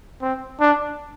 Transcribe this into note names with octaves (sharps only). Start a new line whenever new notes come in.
C4
D4